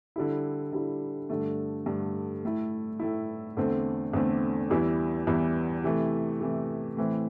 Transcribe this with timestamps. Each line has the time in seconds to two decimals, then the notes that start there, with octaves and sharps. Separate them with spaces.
0.16 D3 G3 E4
0.72 D3 G3 E4
1.29 G2 D3 A3
1.86 G2 D3 A3
2.44 A2 A3 E4
2.99 A2 A3 E4
3.57 E2 D3 A3 C4
4.13 E2 D3 A3 C4
4.70 E2 E3 G3 E4
5.27 E2 E3 G3 E4
5.84 C3 E3 A3
6.41 C3 E3 A3
6.97 A2 E3 C4